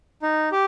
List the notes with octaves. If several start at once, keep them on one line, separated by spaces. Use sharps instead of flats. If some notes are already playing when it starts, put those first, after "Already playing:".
D#4
G4